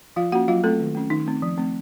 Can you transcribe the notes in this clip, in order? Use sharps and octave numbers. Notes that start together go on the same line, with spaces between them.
F3 F4 F5
A#3 C#4 F#4 F#5
F#3 F4 F5
A3 C4 A4
D#3
A3 C#4
D#3 D#4
A3 C4
F3
A3 C4